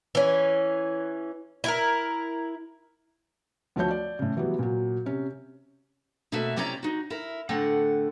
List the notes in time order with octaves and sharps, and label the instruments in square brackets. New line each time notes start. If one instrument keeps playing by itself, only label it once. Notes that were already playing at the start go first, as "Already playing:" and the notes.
[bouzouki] E3 C#4
E4 F4 A#4
[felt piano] D2 F3 A3 C#5 G6
D5
A2 C#3
E3 F#3 G3 B3
A#2 F#3
C3 C#4
[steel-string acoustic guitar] B2 A3 A#3 C4 F#4 E5
C3 C4 C#4 E4 D5 A#5
D#4 F#4
E4 A#4
A2 D3 A3 C4 F#5